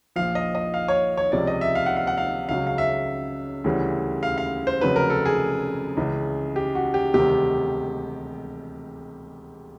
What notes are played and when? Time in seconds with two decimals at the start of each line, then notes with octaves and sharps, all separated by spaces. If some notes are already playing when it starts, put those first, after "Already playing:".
0.16 A#1 A#2 F3 F5
0.35 D#5
0.55 D#5
0.74 F5
0.88 C#5
1.17 C#5
1.32 C#2 C3 F3 D5
1.47 D#5
1.61 E5
1.75 F5
1.86 F#5
1.96 F5
2.07 F#5
2.18 F5
2.49 C#2 C#3 F#3 F5
2.67 F5
2.78 E5
3.64 D2 C#3 E3 G3
4.23 F5
4.38 F5
4.67 C5
4.81 F1 F2 C#3 F#3 B4
4.96 A#4
5.10 A4
5.25 G#4
5.97 C#2 C#3 E3
6.56 G4
6.75 F#4
6.94 G4
7.14 E1 D2 C3 D#3 G3 G4